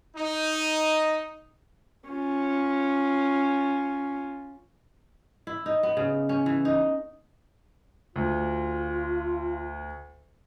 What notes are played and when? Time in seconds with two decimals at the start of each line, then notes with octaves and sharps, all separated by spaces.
0.16 D#4
2.08 C#4 F4
5.47 E4
5.66 D#4
5.83 B3
5.97 C#3
6.29 C#4
6.46 E3
6.65 D#4
8.16 D2 F4